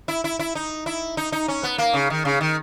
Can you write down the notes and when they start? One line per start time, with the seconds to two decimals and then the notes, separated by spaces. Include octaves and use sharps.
0.08 E4
0.24 E4
0.39 E4
0.55 D#4
0.86 E4
1.17 D#4
1.32 D#4
1.48 C#4
1.63 B3
1.78 A#3
1.94 C#3
2.10 D#3
2.25 C#3
2.41 D#3